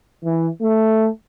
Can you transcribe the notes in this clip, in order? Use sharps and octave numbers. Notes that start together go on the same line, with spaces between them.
E3
A3